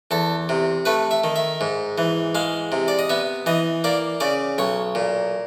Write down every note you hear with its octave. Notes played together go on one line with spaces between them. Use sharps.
E2 A4
C3
A3 B4
E5
D#3
E5
G#2
E3
G#3 F5
C3
D5
D#5
B3 E5
E3 D#5
A#3 D5
C#3 D5
B1 C#5
A#2